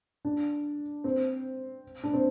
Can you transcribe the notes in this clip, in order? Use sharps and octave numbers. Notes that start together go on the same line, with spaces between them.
D4
C4
D4
C4